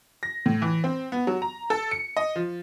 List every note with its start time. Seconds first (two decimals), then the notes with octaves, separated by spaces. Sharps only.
0.23 A#6
0.46 A2
0.62 E3
0.84 C4
1.12 B3
1.27 F#3
1.42 A#5
1.70 A4
1.91 C#7
2.17 D#5
2.36 F3